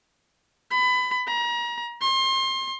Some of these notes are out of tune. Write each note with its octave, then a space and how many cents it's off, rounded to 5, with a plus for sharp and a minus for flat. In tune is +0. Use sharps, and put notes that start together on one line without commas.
B5 +25
A#5 +35
C6 +30